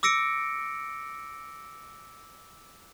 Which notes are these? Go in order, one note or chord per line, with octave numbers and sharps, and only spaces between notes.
D6 E6 A#6 C#7 D7